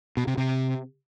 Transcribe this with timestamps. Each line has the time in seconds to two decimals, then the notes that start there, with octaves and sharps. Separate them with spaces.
0.17 B2
0.27 C3
0.37 C3